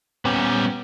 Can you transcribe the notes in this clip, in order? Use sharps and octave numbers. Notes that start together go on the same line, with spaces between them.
A#2 G3 B3 C#4